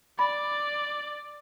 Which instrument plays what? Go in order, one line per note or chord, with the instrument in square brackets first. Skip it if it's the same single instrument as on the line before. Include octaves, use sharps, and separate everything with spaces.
[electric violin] D5 [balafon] B5